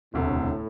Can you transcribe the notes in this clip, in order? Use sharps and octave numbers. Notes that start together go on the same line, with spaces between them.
E1 D2 A2 C3